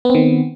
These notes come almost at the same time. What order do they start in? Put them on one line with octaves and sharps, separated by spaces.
B3 C4 D#3